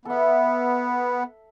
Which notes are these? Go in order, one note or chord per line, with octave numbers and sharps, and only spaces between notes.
B3 A4 E5